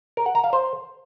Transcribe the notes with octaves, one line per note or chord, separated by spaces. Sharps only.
A#4
F#5
A#5
F5
C5